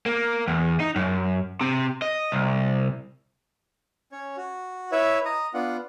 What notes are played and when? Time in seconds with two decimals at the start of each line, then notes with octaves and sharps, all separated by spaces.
0.06 A#3
0.48 E2
0.80 D#4
0.96 F#2
1.61 C3
2.02 D#5
2.32 C2
4.12 C#4 C#5
4.37 F#4
4.92 E4 B4 C#5 E5
5.25 D#5 A#5 D#6
5.54 B3 D4 F4 F#5